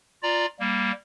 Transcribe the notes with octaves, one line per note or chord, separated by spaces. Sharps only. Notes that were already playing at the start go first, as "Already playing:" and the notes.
F4 D5 A#5
G3 A#3